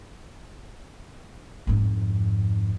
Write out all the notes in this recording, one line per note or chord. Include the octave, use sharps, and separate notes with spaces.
F2 G#2